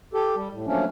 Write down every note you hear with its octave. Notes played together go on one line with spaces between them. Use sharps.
G4 A4
G3
A2
F3 F#3 A3 A#3 C#4 D4